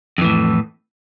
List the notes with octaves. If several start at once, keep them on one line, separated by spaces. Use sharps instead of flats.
F2 A2 E3